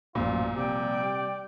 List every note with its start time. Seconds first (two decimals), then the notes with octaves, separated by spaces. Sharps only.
0.15 A1 F#2 A#2 F3 F4
0.55 C3 G3 D5 G5